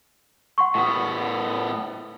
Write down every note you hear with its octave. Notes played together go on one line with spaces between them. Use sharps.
F#5 C6 C#6
A2 B3